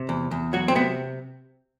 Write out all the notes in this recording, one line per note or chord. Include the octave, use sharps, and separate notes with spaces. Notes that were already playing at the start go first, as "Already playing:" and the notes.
Already playing: C3
E2
E2
F#3 F#4
C4
C3 B3